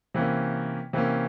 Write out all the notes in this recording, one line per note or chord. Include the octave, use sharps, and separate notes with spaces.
C3 E3 A#3 C#4
C3 E3 A#3 C#4